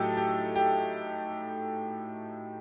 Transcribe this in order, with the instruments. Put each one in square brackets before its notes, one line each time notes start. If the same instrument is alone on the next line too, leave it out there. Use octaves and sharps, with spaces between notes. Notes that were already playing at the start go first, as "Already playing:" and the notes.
Already playing: [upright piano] A2 F#3 A3 D#4 G4 A4
G4
G4